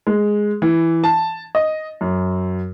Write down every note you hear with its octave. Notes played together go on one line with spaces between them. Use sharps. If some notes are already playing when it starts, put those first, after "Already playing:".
G#3
E3
A5
D#5
F#2